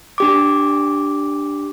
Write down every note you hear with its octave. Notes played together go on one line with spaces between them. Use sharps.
D4 G4 D6